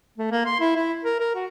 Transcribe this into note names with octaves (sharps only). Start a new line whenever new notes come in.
A3
A#3
C6
E4
E4
A#4
A#4
F#4